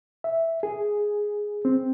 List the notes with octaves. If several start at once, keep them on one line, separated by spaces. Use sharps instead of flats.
E5
G#4
C4